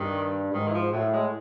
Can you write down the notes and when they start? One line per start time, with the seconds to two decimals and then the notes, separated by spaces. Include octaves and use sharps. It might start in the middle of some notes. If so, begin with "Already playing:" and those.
Already playing: G2 D#3
0.53 G#2 D#3
0.68 E3
0.74 F3
0.92 A2 F#3
1.13 G#3